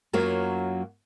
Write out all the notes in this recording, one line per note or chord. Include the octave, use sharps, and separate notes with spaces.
F#2 F#3 A#3 F4 C#5